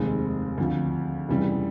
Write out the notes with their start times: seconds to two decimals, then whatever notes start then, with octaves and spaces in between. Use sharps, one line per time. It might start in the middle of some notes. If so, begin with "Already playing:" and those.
Already playing: F1 D#2 D#3 G#3 C4
0.58 D2 C3 F3
1.29 F1 F2 C#3 E3 G3